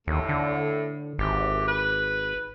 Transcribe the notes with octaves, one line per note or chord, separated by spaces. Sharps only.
D#2 A2
D3
G#1 E3 G4
B4